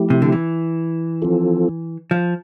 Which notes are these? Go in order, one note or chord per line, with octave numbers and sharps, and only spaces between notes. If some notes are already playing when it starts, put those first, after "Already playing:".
Already playing: F3 A3 E4 G4
C3
D3
E3
F3 C4 F4 A4
F3